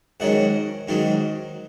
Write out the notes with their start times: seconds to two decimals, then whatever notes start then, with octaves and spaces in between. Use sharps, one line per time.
0.20 G#2 D#3 F#3 C#4 F#5
0.88 G#2 D#3 F#3 C#4